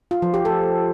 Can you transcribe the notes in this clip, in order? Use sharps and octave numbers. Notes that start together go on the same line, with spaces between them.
F4
F3
G4
A4